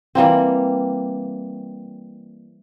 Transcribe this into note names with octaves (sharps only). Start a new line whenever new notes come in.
E3 G3 A#3 C4